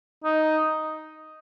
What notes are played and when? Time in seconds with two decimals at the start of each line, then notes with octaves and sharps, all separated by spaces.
0.24 D#4